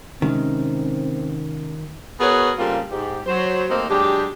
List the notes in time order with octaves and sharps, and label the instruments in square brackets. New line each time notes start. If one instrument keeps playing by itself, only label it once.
[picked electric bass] C3 G#3 C#4 [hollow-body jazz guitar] D#3 [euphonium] C4
[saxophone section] B3 F#4 G#4 A#4 B4 C#5
C#3 G3 A#3 C4 F4 A4
G#2 G4
F#3 C5
A3 A#3 C4 D#4 G4 C5
F#3 G#3 D4 G4